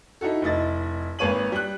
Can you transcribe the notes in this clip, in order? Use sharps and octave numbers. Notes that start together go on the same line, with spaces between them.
D#4 E4 F#4 A4
F1 E4 D#5 A6
G#1 A#3 B4 C#5 D#7 F#7
G3 F#6